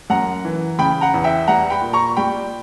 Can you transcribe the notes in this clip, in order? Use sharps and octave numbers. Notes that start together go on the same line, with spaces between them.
F#2 F#5 A#5
E3
C#3 G5 B5
F#5 A#5
E2
E5 G5
G3 F#5 A#5
G5 B5
A#2
A#5 C#6
G3 G5 B5